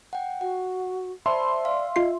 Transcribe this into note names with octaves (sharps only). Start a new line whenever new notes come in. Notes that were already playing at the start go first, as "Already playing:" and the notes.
F#5 G5
F#4 F#5
C5 D5 E5 A5 B5 C6
D5 F5
F4 D#5 C7